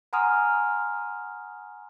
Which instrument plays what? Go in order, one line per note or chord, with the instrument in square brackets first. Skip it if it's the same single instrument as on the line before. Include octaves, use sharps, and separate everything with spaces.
[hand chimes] F#5 G#5 A#5 C6 D#6 F6